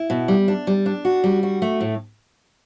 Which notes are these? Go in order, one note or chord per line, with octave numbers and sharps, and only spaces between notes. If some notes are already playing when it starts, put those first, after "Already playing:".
Already playing: E4
B2
G3
D4
G3
D4
F#4
G3
F#4
A3
A2